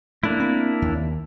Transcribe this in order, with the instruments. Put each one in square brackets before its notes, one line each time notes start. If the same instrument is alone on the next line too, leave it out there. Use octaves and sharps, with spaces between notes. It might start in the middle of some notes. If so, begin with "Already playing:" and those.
[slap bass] A3 [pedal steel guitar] A#3 D4 E4
[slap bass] C4
D#2